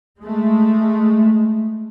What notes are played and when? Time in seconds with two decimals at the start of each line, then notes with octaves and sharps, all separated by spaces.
0.19 G#3 A3